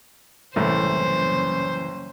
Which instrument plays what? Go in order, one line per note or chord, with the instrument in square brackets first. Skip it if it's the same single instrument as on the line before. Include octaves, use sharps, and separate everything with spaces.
[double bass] F#1 C#4 [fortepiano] C2 A2 [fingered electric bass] E3 [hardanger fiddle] C5